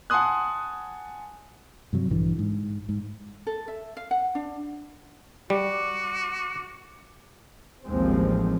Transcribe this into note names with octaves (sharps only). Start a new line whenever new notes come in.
F#5 G#5 A5 C6 D#6 F#6
G2 C3 F#3
A#1 G2 D3 E3
G#2
G#2
A4
E5
F5
F#5
D4
G3 F#4 D6
A1 D#2 F3 G#3 C4